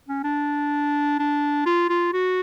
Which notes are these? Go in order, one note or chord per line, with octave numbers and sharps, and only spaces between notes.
C#4
D4
D4
F4
F4
F#4